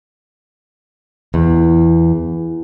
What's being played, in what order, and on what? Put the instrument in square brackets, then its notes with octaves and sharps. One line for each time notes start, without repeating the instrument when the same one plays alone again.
[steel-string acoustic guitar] E2